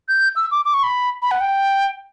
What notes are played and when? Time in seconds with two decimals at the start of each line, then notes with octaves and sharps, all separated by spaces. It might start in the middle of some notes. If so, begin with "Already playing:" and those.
0.09 G6
0.36 E6
0.51 D6
0.65 D6
0.74 C#6
0.83 B5
1.22 B5
1.31 F#5
1.41 G5